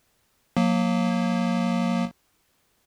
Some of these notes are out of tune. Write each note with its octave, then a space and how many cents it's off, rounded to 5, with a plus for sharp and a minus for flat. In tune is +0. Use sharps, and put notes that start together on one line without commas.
F#3 -35 A#3 +0